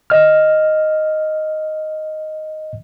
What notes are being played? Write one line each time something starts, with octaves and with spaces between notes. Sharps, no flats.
D#5 F6